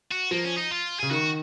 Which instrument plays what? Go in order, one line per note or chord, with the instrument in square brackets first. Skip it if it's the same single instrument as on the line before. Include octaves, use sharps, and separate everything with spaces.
[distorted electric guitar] F#4
[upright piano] F3 [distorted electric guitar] A#3
[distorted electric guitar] C#4
D#4
F4
[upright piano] C#3 [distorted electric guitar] G#4
[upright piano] D#3 [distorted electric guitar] F#4